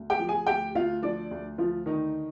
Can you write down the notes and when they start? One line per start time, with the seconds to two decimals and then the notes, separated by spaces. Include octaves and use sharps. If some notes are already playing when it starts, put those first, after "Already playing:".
Already playing: D2
0.10 G4 G5
0.19 F3
0.28 G#4 G#5
0.47 D2 G4 G5
0.75 D2 F4 F5
1.02 F3 D4 D5
1.31 D2
1.58 D2 F3 F4
1.86 D3 D#3 D#4